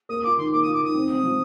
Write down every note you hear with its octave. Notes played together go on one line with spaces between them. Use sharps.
A#3 D#6
F4 D6
D#3 C6
A#3 D6
D#6
F4
D6
D#3 D#6
C4
C4
F3